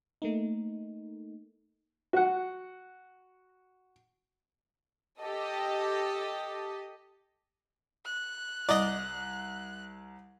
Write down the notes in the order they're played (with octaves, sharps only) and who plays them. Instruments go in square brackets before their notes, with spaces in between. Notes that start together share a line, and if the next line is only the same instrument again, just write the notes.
[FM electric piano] A3 A#3 D#4
[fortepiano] F#4 F#5
[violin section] G4 A4 D#5
[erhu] F#6
[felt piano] C2 [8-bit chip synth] D5 D#5